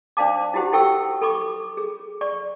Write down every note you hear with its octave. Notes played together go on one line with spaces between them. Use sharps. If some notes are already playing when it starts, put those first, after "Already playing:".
D4 C5 D5 F5 A5 D6
E4 F#4 G4 C5 F#5
E4 G4 A4 G5 C#6 E6
A4 B5 C#6 D6
G#4
D5 C#6